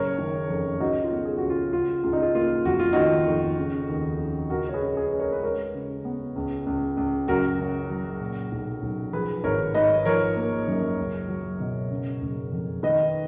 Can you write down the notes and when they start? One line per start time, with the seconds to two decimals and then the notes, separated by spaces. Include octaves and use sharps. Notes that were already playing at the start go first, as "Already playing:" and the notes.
Already playing: F#1 A#4 C#5
0.18 D#3
0.50 F2
0.80 C#2 D#4 F#4
1.04 F4
1.11 B3
1.25 G#4
1.38 C#2 F#4
1.50 F4
1.73 C#2 F4
2.04 C#2 F4
2.13 D#4
2.22 F4
2.35 A#3 F4
2.65 F1 F#4
2.79 F4
2.93 D#3 D#4 F#4
3.27 F2
3.58 C#3
3.89 D#2
4.19 C#3
4.50 C#2 F#4 A#4
4.69 C#5
4.74 G#4 B4
4.81 C#4
4.97 G#4 B4
5.13 C#4
5.20 A#4 C#5
5.32 B4
5.43 G#3 A#4 C#5
5.74 C#3
6.05 B3
6.36 C#2
6.66 C#2
6.97 C#2
7.28 F#1 F#4 A#4
7.59 C#3
7.89 F#3
8.20 A#2
8.52 B1
8.82 B1
9.13 F3 G#4 B4
9.44 G#1 A#4 C#5
9.74 G#2 B4 D#5
10.05 F3 A#4 C#5
10.36 A#3
10.68 F#2
10.98 C#2
11.29 F#3
11.60 B2
11.90 C#3
12.21 F#1
12.52 F2
12.83 D#3 B4 D#5